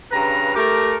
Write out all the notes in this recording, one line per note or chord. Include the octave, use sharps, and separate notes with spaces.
G2 C#3 B4 A#5
A3 G4 A#4